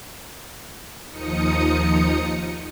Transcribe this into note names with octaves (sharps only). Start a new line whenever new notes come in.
D#2 F3 D#4 D#6 C#7